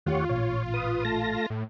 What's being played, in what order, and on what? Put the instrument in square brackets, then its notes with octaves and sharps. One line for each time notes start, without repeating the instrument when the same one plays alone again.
[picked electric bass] E2 D#3 A3 [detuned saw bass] F4 [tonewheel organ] G4 C#5 F#5
[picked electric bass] A1 A#2 [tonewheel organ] C#5
[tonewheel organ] B4 D#6
A3 A5 A#6
[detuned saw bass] A2